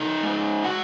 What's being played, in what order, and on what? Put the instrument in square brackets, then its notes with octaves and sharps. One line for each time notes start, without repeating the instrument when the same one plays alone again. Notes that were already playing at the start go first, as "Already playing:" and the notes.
Already playing: [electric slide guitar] C#3 D#4 D#5
G#3
F#4 F#5